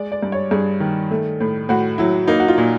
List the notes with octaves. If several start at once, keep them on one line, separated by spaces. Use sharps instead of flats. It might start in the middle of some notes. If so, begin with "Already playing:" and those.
Already playing: G#3 D5
D5
G2
C#5
G2 G#4
D#3
A3
A2
A2 F#4
F#3 E4
A#3 D#4
F#4
F4
A#2